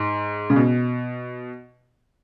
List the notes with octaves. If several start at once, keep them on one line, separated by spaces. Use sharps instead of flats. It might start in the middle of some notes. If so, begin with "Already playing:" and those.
Already playing: G#2
C#3
B2